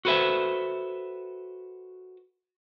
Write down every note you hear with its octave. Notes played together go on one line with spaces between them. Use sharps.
F#4 A4 B4 C5 E5